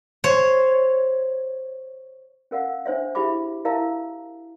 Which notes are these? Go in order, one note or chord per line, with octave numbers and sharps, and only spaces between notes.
C5 C#5
C#4 A#4 F5 F#5
D4 C5 C#5 E5
E4 G4 G#4 E5 B5 D6
E4 A#4 E5 F5 A5 A#5